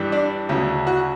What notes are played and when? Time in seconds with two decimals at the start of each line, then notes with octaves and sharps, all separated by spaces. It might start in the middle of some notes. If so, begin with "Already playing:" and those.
Already playing: G2 E3 G3
0.12 D4
0.49 D2 C#3 F#3
0.87 F#4